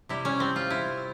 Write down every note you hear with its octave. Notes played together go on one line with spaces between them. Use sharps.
C3 G3 E4
C#4
C4
F4
E4